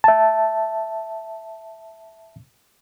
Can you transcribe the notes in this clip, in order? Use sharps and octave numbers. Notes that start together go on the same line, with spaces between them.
E5 A5